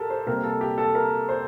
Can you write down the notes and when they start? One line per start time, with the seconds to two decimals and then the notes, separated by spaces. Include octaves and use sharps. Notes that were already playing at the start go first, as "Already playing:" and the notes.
Already playing: G4 A4 A#4
0.10 C5
0.27 C3 G3 A#3 A#4
0.44 A4
0.61 G4
0.78 A4
0.95 A#4
1.29 C5